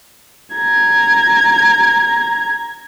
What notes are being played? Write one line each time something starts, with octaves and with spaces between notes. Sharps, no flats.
A#5 G#6